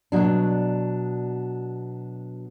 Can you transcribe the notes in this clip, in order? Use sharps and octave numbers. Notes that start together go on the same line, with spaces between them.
B2 F#3 D4